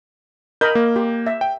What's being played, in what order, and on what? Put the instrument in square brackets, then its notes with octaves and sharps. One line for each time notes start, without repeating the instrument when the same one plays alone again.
[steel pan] A#4 D#5 B5 [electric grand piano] G6
[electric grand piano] A#3
[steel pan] G4
E5
[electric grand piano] G5